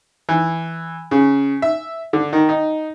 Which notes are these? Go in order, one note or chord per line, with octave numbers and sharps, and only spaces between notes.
E3
C#3
E5
D3
D#3
D#4